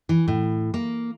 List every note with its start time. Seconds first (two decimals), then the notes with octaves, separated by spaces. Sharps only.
0.09 E3
0.28 A2
0.74 A#3